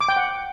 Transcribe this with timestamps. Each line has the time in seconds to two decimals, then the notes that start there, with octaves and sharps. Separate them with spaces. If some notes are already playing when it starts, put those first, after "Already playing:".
0.01 D6
0.08 G5
0.16 F#5